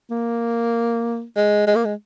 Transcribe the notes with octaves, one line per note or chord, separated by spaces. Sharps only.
A#3
G#3
G#3
A#3
G#3